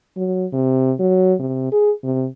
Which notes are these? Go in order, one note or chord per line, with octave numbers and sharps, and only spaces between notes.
F#3
C3
F#3
C3
G#4
C3